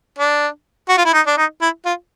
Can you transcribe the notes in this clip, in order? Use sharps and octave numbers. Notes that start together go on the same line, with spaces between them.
D4
F#4
F4
E4
D#4
D4
D#4
E4
F4